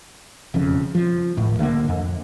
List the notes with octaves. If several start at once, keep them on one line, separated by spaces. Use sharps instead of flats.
E1 F2 C#3
F3
D1 G#1 A2
C2 D3 G#3 A#3
F2